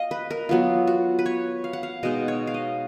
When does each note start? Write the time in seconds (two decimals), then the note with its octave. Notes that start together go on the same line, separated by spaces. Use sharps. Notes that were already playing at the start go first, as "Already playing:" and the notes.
Already playing: D#5 F5
0.11 B4
0.31 A#4
0.49 F#3 B3 F4
0.87 F#4
1.19 B4
1.26 C#5
1.64 F5
1.73 F#5
1.83 F5
2.03 B2 G#3 D#4 D#5
2.28 C#5
2.47 F5
2.54 D#5